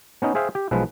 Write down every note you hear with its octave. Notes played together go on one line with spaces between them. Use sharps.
B3 C#4 D#4
G#4 C5 E5 F5 G5
G4
B1 F3 G#3 B4